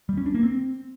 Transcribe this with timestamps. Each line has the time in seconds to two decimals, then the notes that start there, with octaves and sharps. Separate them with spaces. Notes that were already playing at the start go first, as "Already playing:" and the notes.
0.09 G3
0.17 C#4
0.26 D4
0.35 A#3
0.43 C4